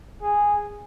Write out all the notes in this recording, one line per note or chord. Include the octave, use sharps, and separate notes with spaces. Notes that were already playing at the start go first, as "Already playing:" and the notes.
G#4